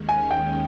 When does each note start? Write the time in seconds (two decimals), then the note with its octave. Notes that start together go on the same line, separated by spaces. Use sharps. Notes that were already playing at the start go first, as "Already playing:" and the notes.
Already playing: D#2 D#3 G#3 C#4
0.09 G#5
0.31 G5